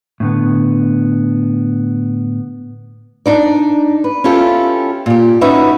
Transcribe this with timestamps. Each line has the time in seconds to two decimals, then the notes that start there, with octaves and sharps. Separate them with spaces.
0.20 A2 D3 B3
3.26 D4 D#4 D5
4.04 B4
4.24 C#4 E4 F4 G4 A4
5.06 A#2 G4
5.41 C#4 D#4 F#4 B4 E5 F#5